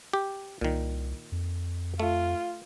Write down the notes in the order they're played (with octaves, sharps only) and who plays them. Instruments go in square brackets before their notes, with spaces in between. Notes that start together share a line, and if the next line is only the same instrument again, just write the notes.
[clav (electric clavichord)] G4
[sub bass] C2 [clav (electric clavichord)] A#2 D#3
[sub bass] F2
[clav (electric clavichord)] A3 [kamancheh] F4